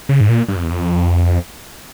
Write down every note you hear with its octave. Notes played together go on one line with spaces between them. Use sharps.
C#3
G#2
A#2
G2
F2
E2
F2